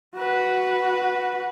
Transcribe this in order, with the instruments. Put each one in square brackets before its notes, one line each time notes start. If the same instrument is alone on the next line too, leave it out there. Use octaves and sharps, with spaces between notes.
[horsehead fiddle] F#4 B4